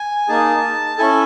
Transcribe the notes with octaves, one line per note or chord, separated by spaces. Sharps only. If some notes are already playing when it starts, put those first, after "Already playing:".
Already playing: G#5
A#3 D#4 G#4 A5
C#4 E4 A4 G#5